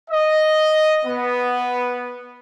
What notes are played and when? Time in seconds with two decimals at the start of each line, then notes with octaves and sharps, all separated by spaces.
0.11 D#5
1.05 B3